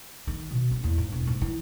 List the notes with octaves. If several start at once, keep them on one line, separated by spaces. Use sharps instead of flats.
D#3
B2
C#4
E2
G#2
E1
G#2
E3